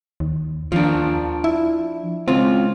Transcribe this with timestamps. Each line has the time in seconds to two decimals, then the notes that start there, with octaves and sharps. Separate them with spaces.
0.20 D#2
0.72 D#2 F3 D4
1.44 E4
2.28 C#2 C4 F4